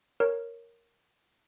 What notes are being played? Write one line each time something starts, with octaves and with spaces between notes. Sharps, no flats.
A#4 C#5